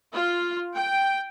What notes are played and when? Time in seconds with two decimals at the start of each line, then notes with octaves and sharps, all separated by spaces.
0.13 F4
0.75 G5